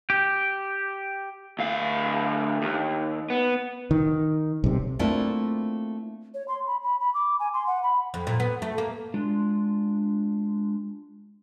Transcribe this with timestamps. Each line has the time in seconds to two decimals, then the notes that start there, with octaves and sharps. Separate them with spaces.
0.10 G4
1.59 D2 F5
2.62 D#2
3.30 B3
3.91 D#3
4.64 B1 C3
4.99 A3 A#3 C4 D4 E4 F4
6.34 C#5
6.48 C6
6.67 B5
6.83 B5
7.00 B5
7.14 D6
7.39 G#5
7.53 C6
7.67 F#5
7.83 B5
8.14 F2
8.27 A#2
8.40 B3
8.62 A3
8.78 A#3
9.14 G#3 D4 F4